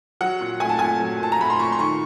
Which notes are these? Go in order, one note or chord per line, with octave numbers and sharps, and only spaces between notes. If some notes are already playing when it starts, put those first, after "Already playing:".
F#3 F#5
A#2
A3 G#5
A5
A#2 G#5
F#3
A#2 A5
A#5
A3 B5
C6
A#2 C#6
C6
D#3 C#6